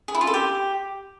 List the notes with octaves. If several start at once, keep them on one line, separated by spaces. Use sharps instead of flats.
G#4
E4
F4
A4
G4